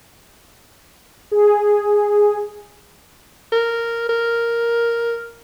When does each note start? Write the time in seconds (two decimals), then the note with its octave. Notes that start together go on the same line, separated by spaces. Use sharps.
1.32 G#4
3.52 A#4
4.09 A#4